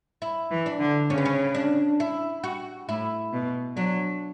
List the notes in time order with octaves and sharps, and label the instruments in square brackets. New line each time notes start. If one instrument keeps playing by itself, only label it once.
[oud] E4
[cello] E3
[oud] D4
[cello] D3
[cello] C#3 [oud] C#4
[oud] B3
C#4
D4
E4
F#4
[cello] A2 [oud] E4
[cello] B2
[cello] F#3 [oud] D4